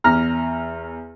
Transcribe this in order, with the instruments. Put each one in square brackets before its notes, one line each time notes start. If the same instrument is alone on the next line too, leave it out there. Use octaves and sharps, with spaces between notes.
[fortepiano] E2 A#5 F6